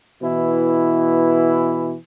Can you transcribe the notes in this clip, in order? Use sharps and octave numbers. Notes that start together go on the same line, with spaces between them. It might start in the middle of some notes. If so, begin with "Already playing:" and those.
B2 E3 E4